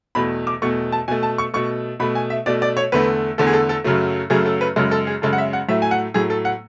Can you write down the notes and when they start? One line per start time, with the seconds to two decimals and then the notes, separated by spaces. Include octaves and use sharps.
0.15 E2 B2 A3 B5
0.47 D6
0.62 E2 B2 A3 C#6
0.92 A5
1.08 B2 A3 G#5
1.23 A5
1.38 C#6
1.54 B2 A3 C#6
2.00 B2 A3 B5
2.15 G#5
2.30 E5
2.46 B2 A3 D5
2.62 D5
2.77 C#5
2.92 E2 D3 A3 B4
3.38 E2 D3 A3 A4
3.47 G#4
3.53 A4
3.69 A4
3.84 F#2 C#3 F#3 A3
4.30 F#2 C#3 F#3 A3 G#4
4.46 A4
4.61 B4
4.76 F#2 C#3 G#3 A4
4.91 A4
5.07 G#4
5.22 F#2 C#3 G#3 A4
5.33 F#5
5.38 E5
5.53 F#5
5.69 A2 F#3 A3 E5
5.82 G#5
5.91 F#5
6.14 A2 F#3 A3 G#4
6.30 A4
6.45 F#5